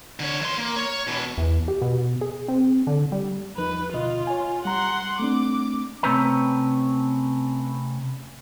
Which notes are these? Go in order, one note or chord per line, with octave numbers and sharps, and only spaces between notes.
D3 C#5
E3 C6
A#3
C#5
B2 E3
E2
G4
B2
G#4
C4
D3
G3
E2 F3 D#4 B4
D2 B2 F4 D#5
C#5 G#5
G3 F#5 A#5 C6
A3 C4 D4 D6
C3 A3 C4 C#4 B4 A#5